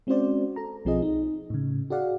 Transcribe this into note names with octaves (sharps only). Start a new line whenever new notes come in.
G#3 C4 C#4 F#4 C5 D5
A4 A#5
B1 F3 C4 F4 G#4 D#5
D#4
A2 C#3
F#4 G#4 D5 F5 F#5